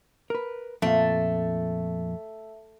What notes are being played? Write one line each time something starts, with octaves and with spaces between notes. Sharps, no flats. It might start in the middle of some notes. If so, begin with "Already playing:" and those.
A#4 B4
F2 A#2 A3 F5